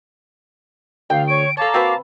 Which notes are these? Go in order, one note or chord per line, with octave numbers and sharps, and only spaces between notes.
D2 F5 G5
C#5 C#6 D7
A4 C#5 F5 A5 A#5 D6
A#3 C4 F#4 B4 C#6